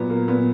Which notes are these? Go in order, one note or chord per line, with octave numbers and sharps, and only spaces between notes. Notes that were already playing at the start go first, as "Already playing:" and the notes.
Already playing: A#2 F#3 B3
A#3
A#2 B3